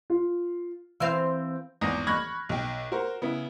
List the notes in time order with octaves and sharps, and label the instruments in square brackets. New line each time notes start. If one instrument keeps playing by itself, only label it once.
[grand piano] F4
[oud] E3 C4 F5 [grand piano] E6 G6
[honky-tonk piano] G#1 E2 D#6 A#6
B5 C#6 F6 F#6 G#6 A#6
B1 G5
F#4 A#4 C5
C#3 B3 E4